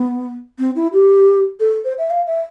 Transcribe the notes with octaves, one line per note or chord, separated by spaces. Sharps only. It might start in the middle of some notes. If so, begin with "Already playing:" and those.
Already playing: B3
C4
E4
G4
A4
C5
E5
F5
E5